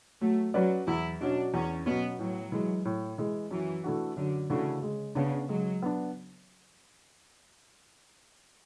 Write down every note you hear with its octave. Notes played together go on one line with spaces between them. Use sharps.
F#3 A3
F#3 C#4 F#4 B4 D5
E2 E4
B2 F#3 C#4 D4
E2 C#4
B2 F#3 B3 C#4
A2 F#3
E3 G#3
A2
E3 G#3
F#2 E3
E3 A3 D4 F#4
F#2 D3
C#3 E3 A3 D4 F#4
G#3
C#3 B3 D4
F#3 G#3
B3 D4